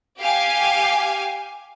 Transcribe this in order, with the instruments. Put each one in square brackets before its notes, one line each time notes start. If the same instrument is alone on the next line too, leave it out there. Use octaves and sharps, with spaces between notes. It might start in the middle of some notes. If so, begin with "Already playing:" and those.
[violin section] G4 F5 G#5